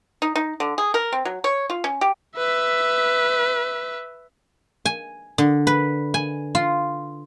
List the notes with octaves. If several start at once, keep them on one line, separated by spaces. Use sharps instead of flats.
D#4
D#4
D3
G#4
A#4
C4
F#3
C#5
F4
C#4
G4
B4 E5
G#5
D3
B4
G#5
F4